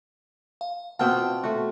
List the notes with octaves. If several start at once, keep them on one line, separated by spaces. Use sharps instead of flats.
F5
B2 C4 F4 F#5 A5 F6
A3 F#4